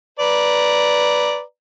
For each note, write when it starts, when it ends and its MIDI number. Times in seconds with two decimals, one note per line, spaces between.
0.19 1.41 71
0.19 1.41 74
0.19 1.41 82